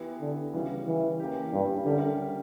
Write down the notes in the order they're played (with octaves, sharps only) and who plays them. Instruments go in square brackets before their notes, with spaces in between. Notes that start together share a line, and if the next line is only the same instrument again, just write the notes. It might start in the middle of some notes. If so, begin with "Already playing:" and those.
Already playing: [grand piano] E3 B3 E4 G4
[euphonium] D3
[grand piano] C#3 G3 C#4 F#4 [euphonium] E3
[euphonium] E3
[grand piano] E3 A#3 C#4 G4
[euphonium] G2
[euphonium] D3 [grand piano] G3 C#4 G4 A#4 E5